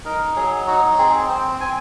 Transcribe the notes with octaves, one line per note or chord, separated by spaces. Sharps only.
D#4 A#4
F#3 G#4
D#4 F#4
C4 G#4
C4 C5
C4 G#5